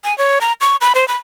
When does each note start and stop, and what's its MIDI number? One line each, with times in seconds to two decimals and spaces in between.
0.04 0.16 80
0.18 0.39 73
0.41 0.53 82
0.61 0.76 85
0.81 0.93 83
0.95 1.07 72
1.08 1.16 83